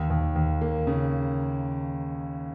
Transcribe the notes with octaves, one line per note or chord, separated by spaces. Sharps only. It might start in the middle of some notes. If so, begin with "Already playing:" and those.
Already playing: D#2
D#2
D#2
A#3
C#3